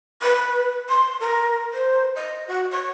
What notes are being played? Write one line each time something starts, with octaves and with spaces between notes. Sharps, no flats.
B4
C6
A#4
C5
D#5
F#4
C#5